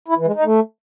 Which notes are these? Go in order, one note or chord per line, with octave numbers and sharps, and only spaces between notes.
E4
E3
G#3
D#4
A3